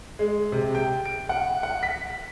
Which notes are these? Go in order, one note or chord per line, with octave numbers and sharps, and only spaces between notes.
G#3
C3
G5
D7
F#5
F#5
B6